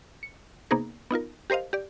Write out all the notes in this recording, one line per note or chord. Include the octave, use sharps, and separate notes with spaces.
C#7
C3 A#3 B3 D#4 G#4 A#4
B3 D#4 F4 A#4
G4 A#4 C5 D#5 F5
G4 D5